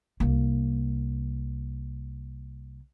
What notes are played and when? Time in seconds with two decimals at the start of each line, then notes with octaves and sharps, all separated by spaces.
0.20 C2 A#3